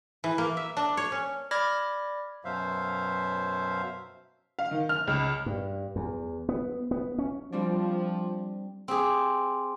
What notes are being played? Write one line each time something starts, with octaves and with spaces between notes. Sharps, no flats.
E3
A#3
E5
D4
C#5
C#4
D5 B5 D6 F6 G#6 A#6
F#2 B2 F#3 C5 E5 F5
F5
D#3
F6
C#2
G2
E2
B3
B3
C#4
F3 G3 C4 D4
C4 G4 G#4